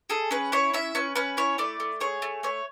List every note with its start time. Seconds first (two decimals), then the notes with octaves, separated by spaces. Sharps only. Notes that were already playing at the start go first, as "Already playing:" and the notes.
0.10 G#4 A4
0.31 C#4 B4
0.52 E4 C#5
0.73 C#4 E5
0.95 C#4 B4
1.15 C#4 B4
1.37 E4 C#5
1.58 A3 D5
1.80 A3
2.00 G#4 C#5
2.22 A3
2.43 A3 C#5